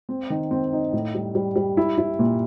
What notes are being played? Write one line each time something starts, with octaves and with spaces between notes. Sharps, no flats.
C4
D#3
C4
D#4
A2
G3
G3
G3
E4
E4
A#2